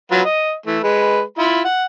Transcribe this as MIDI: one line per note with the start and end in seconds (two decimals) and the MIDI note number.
0.11 0.21 54
0.11 0.21 65
0.11 0.21 71
0.25 0.54 75
0.66 0.78 52
0.66 0.78 57
0.83 1.21 56
0.83 1.21 71
1.38 1.62 64
1.38 1.62 65
1.38 1.62 83
1.65 1.85 78